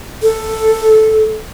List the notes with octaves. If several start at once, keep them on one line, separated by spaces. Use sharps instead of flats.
A4